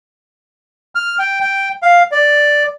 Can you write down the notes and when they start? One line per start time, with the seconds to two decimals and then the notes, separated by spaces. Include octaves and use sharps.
0.95 F6
1.19 G5
1.41 G5
1.82 F5
2.12 D5